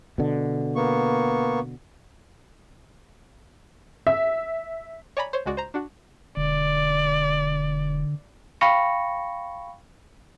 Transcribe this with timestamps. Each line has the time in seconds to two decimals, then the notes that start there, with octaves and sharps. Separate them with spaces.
0.18 B2 D3
0.76 A#3 B3 C#6
4.07 E5
5.17 C#5 D5 G#5 A#5 B5
5.33 C5 C#5
5.46 C#2 G#3 F#4 D5
5.57 C5 A#5
5.74 D4 F#4
6.37 E1 D3 D5
8.61 F5 G5 B5 C#6 A#6 C#7